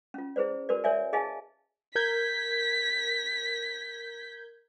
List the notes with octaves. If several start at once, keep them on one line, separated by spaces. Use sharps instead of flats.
C#4 F4
E4 G#4 B4 C5 D5
F#4 A#4 B4 D5
A#4 C#5 D5 E5 G#5
E4 G#4 D#5 F5 G#5 A5
A#4 G6 G#6 B6